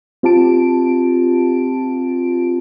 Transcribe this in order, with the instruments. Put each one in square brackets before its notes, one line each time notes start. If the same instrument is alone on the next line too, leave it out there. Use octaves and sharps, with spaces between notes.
[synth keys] C4 F4 G4 A5 D7